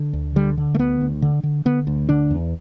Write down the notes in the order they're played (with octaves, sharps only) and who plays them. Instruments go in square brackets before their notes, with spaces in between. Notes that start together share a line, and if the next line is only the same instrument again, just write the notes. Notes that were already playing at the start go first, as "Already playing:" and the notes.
Already playing: [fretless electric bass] D3
D2
D3 G3
D3
A3
D2 B3
D2
D3
D3
D3 B3
D2
D3 D4
E2